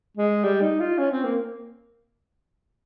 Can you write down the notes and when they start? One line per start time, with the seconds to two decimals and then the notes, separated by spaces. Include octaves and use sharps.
0.17 G#3
0.44 G3
0.61 D#4
0.80 F4
0.98 C#4
1.11 C4
1.24 A#3